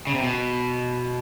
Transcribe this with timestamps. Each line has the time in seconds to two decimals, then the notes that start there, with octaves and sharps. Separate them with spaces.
0.07 C#3
0.14 C3
0.22 B2